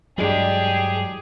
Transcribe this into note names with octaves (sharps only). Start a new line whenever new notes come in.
G2 E3 F#3 G#3 D4 G4 G#4